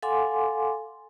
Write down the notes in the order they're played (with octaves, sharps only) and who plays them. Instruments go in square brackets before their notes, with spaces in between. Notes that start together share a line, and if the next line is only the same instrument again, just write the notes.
[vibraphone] A4 F5 F#5 G#5 C6 D6